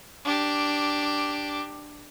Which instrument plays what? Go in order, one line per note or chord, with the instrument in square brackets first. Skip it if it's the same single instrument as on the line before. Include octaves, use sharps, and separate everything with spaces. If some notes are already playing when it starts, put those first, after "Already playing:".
[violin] D4 G4